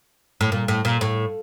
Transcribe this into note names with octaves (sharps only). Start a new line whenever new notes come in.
A2
A#2
A2
A#2
A2